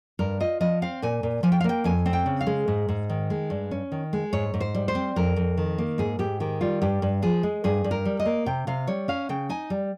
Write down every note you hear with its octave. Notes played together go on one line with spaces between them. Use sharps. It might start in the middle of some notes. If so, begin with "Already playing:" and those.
G2 A#4
F4 D#5
F3 D#5
C4 F5
A#2 G#5
A#2
F3 G#5
G5
F5
A#3 G5
F2 G#5
C4
G5
C#3
F5
G#3
G#2
G#2
D#3
G#3
G2
C#4
D#3
G#3
G#2 C#5
G#2
C5
G3
C5
C4
F2 A#4
F2
D#3
A#3
G#2 G#4
G#2 G4
D#3 G4
G3 F4
G2 G4
G2
F3 G#4
G#3
G2 G#4
G2
A#4
G3
D#5
A#3
C3 G5
C3 F5
G3 C#5
C#4 F5
C#3 G5
D#4 G#5
G3